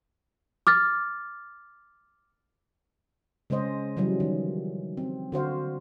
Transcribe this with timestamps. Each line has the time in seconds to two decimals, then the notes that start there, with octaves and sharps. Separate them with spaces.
0.67 D6 F6 A6
3.50 C#3 G#3 C#4 C5 D#5
3.97 C#3 E3 F#3 G3
4.20 D#3
4.97 C4
5.32 D3 F#4 C5 F5